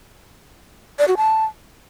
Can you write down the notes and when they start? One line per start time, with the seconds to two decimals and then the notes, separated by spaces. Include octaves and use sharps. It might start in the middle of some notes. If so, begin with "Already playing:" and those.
0.99 D5
1.08 F#4
1.17 A5